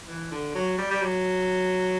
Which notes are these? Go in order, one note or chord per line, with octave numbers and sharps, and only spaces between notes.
E3
D3
F#3
G3
G3
F#3